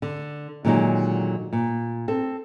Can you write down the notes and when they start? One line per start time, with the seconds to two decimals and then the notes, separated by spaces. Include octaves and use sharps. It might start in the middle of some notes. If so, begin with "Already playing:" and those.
0.02 D3
0.65 A#2 D3 D#3 F#3 G#3
1.53 A#2
2.08 C4 A4